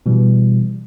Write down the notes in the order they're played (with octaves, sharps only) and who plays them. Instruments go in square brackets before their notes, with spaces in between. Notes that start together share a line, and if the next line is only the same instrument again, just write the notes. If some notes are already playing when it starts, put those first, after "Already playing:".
[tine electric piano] B2 E3 G3